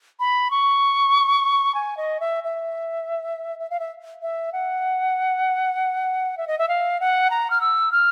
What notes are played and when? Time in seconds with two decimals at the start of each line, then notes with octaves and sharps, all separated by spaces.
0.20 B5
0.51 C#6
1.75 G#5
1.97 D#5
2.20 E5
2.44 E5
3.59 E5
3.70 F5
3.80 E5
4.22 E5
4.53 F#5
6.38 E5
6.47 D#5
6.59 E5
6.68 F5
7.00 F#5
7.30 A#5
7.50 F6
7.61 E6
7.92 F6